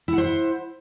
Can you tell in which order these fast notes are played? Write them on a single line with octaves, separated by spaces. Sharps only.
E4 F#5 C5